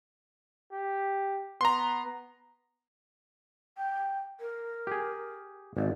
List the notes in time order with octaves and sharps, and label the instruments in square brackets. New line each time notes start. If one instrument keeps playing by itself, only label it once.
[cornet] G4
[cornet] B3 [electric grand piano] A#5 C6
[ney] G5
A#4
[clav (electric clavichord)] G4 G#4
[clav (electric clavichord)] G#1 [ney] D5